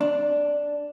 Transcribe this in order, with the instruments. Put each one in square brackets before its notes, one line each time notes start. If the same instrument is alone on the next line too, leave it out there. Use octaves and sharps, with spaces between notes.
[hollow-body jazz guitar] D4